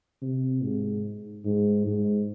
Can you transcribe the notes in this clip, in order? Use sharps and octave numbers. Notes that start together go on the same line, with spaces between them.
C3
G#2
G#2
G#2